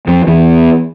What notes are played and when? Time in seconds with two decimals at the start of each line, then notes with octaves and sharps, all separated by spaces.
0.08 F2 F3
0.27 E2 E3